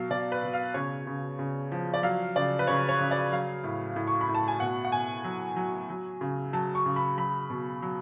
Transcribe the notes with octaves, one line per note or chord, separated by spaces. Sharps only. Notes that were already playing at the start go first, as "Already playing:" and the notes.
Already playing: B2 F#3 F5
B2 D5
B4
B2
F5
C#3 C#5
C#3
C#3
F3
D5
F#3 F5
C#3 D5
B4
C#3 C#5
C#5
C#3
D5
F#3 F5
A2
A2
C#6
B5
A2
A5
G#5
B2 F#5
F#5
B2 G#5
F#3
F#3
F#3
C#3
F#3 A5
C#6
C#3
B5
F#3 B5
B2
F#3